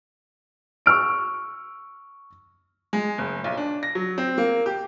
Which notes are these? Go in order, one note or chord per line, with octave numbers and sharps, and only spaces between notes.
C#6 E6 F6 D7
G#3
F#1
B1
D4
A#6
F#3
C4
A#3
G4